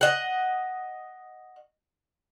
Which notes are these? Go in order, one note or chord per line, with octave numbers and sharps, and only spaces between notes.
D#5 F#5